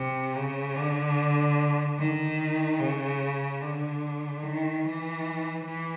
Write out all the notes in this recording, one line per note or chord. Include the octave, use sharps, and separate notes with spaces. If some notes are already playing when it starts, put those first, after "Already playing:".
Already playing: C3
C#3
D3
D#3
C#3
D3
D#3
E3
E3